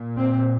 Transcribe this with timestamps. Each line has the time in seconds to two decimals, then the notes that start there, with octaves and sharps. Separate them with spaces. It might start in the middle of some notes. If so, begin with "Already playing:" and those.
Already playing: A#2
0.17 C4